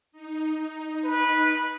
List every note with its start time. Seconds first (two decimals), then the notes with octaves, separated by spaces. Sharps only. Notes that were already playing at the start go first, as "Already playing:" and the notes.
0.12 D#4
1.04 B4